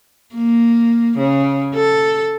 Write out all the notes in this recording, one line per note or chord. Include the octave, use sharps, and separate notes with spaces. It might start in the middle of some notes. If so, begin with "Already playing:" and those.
A#3
C#3
A4